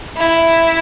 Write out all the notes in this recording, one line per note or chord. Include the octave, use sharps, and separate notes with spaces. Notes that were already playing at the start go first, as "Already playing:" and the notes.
E4